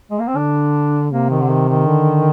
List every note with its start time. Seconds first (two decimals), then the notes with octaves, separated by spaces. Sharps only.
0.11 G#3
0.19 A#3
0.28 C4
0.35 D3 D4
1.11 C3 A#3
1.30 D#3
1.42 D3
1.49 D#3
1.68 D#3
1.87 D3